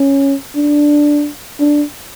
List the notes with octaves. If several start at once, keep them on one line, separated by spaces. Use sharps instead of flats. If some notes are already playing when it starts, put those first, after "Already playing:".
Already playing: C#4
D4
D4